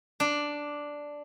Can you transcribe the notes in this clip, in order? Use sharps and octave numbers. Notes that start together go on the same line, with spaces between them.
D4